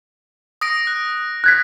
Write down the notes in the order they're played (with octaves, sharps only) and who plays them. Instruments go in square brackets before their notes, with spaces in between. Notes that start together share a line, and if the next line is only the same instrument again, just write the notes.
[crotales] D#6 A#6 D7
F#6
[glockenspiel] F#6 G#6 B6